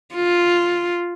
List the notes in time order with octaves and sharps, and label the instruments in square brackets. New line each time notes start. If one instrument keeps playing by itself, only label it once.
[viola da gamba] F4